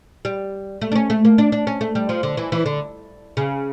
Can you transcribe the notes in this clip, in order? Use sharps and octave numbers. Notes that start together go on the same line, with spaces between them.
G3
A3
D4
C#4
A3
A#3
D4
D4
C#4
A3
G3
F3
D3
E3
E3
D3
C#3